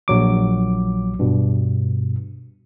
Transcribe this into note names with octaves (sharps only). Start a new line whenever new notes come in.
A#1 F#3 D6
G2 B2